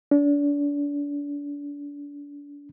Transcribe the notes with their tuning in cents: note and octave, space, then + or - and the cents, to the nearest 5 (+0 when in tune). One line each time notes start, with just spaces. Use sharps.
D4 -35